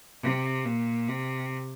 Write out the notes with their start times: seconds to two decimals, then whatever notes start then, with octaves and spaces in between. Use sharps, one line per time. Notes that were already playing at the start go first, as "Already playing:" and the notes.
0.23 C3
0.65 A#2
1.08 C3